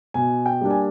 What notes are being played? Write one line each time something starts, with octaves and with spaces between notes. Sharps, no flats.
B2 G#5
G5
G3 A#3 D4
G#5